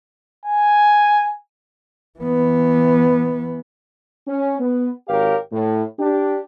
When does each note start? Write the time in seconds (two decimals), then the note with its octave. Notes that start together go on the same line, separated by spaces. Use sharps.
0.45 G#5
2.19 E3 B3
4.27 C#4
4.60 B3
5.09 G#1 G4 A#4 C#5 F5
5.53 A2
5.99 D4 G4